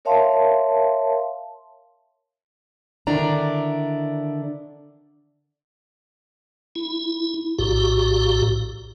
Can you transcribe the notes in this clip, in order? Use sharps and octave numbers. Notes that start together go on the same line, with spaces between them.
A#4 C#5 E5 F5 A5 C6
D3 D#3 D4 E4 D5 A#5
E4
A#1 A2 F#4 G4